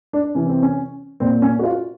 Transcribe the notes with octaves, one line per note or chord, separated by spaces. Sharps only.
D4
C3 E3 C#4
C4
C#4
A#2 C4
C#4
F#4
F4